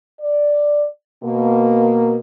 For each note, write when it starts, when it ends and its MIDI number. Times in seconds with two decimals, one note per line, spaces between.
0.20 0.86 74
1.23 2.17 47
1.23 2.17 58